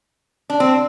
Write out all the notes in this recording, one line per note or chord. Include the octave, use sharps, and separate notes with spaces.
D4
C4